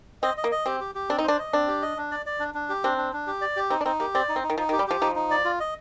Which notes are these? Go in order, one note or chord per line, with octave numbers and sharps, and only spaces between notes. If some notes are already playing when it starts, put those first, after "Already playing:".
C4 D#5
D#5
A#3
D#5
C4 G4
G4
G4
C4 D4
D#4
D4 C5
D#5
C4 D4
G4
D#5
D4
D5
D5
D4
D4
G4
C4 D4
D4
D4
G4
D5
G4
C4 D#4
D4
C4 D#4
A#3 G4
C4 D5
D#4
C4
D#4
D#3
F3 D#4
D#3
G4
G3
F3 G4
F3 D#4
D#4
D5
F4
D#5